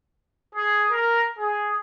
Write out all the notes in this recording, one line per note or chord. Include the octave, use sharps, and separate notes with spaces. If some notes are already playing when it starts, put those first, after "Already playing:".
G#4
A#4
G#4